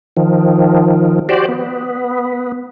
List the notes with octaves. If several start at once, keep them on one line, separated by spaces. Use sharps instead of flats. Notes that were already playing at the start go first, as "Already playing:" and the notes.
D#3 F3
F#4 G4 C5 D5
B3